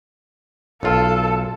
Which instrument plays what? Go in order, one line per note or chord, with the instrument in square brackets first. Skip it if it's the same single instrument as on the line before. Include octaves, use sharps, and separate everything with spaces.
[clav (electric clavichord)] B1 F4 [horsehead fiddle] A4